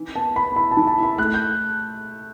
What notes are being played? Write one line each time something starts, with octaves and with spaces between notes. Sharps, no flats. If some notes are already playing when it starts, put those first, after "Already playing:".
Already playing: E3
B3 A5
B3 B5
E4 B5
A5
E3
A5
E4 B5
A3 F#6
G6